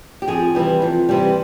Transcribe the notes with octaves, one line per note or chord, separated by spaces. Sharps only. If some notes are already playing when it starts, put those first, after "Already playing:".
G4
F2 G#4
C3 E3 G3
F2
C3 E3 G3